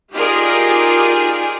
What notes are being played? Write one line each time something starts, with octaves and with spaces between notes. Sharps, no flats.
D#4 F4 G4 G#4 A#4 D5